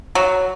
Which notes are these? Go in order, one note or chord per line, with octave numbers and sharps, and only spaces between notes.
F#3